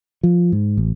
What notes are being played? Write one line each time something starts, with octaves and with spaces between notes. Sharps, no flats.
F3
G#2
A1